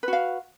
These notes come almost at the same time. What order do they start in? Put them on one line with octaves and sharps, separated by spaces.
B4 F#4 F5